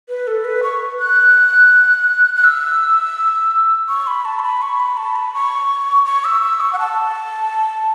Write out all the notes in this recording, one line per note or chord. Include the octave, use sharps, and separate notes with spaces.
B4
A4
B4
C#6
F#6
F#6
E6
C#6
B5
A5
C#6
B5
C#6
B5
A5
B5
C#6
C#6
E6
E6
C#6
F#5
A5